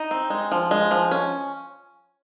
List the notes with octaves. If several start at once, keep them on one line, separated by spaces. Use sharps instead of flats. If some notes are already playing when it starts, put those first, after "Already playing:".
Already playing: D#4
C4
G#3
F3
G#3
F3
C#4